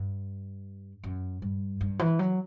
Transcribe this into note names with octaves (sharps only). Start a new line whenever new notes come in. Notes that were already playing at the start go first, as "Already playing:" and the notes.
Already playing: G2
F#2
G2
G2
E3
F#3